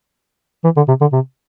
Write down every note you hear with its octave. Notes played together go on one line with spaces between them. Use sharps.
E3
D3
C3
D3
C3